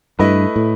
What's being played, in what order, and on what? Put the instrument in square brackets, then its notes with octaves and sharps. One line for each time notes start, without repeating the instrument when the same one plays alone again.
[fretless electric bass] G2 [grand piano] A3 E4 B4 D#5
[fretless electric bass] A2